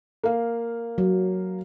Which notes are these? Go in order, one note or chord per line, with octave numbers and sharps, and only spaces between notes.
A#3 F5
F#3